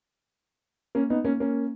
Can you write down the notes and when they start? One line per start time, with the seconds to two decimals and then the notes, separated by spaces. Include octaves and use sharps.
0.95 A#3 C#4
1.10 B3 D#4
1.25 A#3 C#4
1.40 A#3 C#4